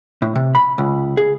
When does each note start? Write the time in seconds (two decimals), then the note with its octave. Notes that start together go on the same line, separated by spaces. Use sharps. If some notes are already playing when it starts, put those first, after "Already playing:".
0.22 A2
0.35 C3
0.55 B5
0.78 C#2
1.17 G#4